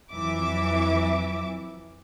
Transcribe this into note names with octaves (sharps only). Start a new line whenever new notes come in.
F2 E3 F#3 E5 D6